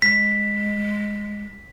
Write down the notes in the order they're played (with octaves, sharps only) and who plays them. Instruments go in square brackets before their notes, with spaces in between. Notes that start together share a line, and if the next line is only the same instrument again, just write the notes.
[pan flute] G#3 [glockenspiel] B6